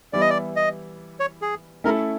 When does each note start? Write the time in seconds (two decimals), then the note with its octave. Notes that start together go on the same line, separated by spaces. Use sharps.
0.13 E3 G3 B3 E4 D5
0.21 D#5
0.30 D5
0.56 D#5
1.20 C#5
1.42 G#4
1.84 A3 C#4 E4 A4 A#4